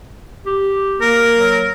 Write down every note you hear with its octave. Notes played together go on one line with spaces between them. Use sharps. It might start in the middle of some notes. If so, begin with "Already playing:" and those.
G4
A#3 A#4
F#3